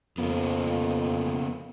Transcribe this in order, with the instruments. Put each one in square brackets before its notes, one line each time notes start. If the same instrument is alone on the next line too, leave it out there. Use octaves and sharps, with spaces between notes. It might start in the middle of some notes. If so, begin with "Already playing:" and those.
[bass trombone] F2 [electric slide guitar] C#3 A#3 B3